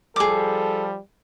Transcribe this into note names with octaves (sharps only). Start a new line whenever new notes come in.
F3 G3 G#4 A4 D6